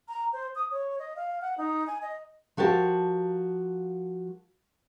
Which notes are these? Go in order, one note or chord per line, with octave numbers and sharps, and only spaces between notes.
A#5
C5
D#6
C#5
D#5
F5
F#5
D#4
G#5
D#5
F3 F#4 G4 A#4 A5